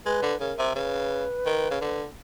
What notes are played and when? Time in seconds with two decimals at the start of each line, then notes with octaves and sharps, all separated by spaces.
0.06 G#3 B4
0.22 D3
0.40 C#3 A#4
0.58 C3
0.75 C#3 B4
1.46 D#3
1.71 C#3
1.81 D3